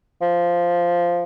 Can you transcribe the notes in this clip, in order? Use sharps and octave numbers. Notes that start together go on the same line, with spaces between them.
F3